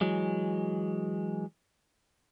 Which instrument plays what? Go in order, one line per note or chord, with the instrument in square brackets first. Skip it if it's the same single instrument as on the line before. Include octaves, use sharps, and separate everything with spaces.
[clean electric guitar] E3 F#3 G#3